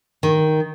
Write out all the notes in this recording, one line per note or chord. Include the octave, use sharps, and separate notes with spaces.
D#3